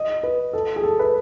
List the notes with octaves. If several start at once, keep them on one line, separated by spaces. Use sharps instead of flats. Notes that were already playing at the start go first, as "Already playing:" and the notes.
Already playing: D#5
B4
A4
G#4
A4
B4